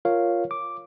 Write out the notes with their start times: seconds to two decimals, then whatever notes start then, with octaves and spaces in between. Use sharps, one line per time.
0.05 F4 A#4 C#5 F5
0.51 D6